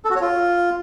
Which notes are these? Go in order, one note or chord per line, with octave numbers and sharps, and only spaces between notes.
A4
F#4
C#5
F4